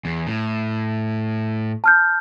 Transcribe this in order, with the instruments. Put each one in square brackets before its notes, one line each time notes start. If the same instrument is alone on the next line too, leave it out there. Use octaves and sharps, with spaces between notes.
[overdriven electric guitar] E2
A2
[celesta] A5 F6 G6